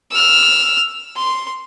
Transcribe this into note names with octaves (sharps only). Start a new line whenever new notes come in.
E6 F6
C6